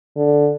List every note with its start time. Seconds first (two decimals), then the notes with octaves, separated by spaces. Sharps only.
0.16 D3